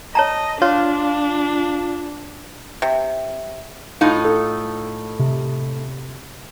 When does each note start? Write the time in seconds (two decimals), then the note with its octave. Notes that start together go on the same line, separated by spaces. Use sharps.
0.15 C#5 D#5 A5 A#5
0.62 D4 F4 C#5
2.82 C3
4.01 A2 D#4 F4
4.25 A4
5.20 C3